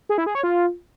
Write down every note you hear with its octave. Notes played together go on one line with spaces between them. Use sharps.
G#4
E4
G#4
C#5
F4